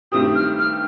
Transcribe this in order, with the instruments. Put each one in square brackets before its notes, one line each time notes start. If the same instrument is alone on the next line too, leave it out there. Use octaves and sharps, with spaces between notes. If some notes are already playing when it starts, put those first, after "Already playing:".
[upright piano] G2 D#3 A3 C4 G4 [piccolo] D#6
[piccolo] F6
F6